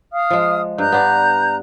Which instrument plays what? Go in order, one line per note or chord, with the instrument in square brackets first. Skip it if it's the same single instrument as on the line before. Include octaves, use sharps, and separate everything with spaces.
[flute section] F5 D#6 F6
[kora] F3 G#3
[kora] G2 [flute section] A#5 F#6 G6
[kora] B3 D4